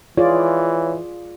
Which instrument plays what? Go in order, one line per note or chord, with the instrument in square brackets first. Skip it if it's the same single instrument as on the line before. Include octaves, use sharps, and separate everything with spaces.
[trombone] E3 [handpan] F4 G#4 D5 [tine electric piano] C#5